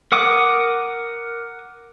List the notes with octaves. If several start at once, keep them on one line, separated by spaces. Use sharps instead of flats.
A#4 F#5 D6 D#6